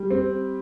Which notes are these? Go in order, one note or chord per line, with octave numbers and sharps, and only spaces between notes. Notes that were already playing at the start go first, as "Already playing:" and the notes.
Already playing: G3
C4